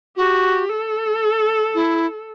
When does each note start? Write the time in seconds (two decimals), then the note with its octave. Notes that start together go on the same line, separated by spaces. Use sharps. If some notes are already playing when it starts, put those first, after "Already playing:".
0.17 F#4 G4
0.69 A4
1.75 E4